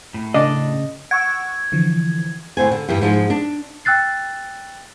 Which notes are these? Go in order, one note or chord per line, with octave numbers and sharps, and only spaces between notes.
A2
C#3 D4 D#5
F#5 C#6 E6 G#6
D3 E3 F3
A2 D3 C5 G#5
D3
G2 E3 G3
G#2 F3 G#3
D4
G5 E6 F#6 A6 C7